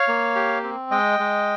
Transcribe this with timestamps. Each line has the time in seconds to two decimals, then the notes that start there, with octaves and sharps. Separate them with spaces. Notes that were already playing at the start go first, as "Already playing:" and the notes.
Already playing: C#5 F5
0.08 A#3
0.35 G4
0.63 C4
0.91 G#3 D#5 G5
1.19 G#3